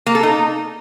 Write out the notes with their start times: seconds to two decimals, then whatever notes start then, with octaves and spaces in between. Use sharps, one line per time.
0.06 A#3
0.15 A4
0.23 D#4